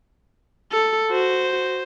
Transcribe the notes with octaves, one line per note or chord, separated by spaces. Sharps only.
A4
F#4 C5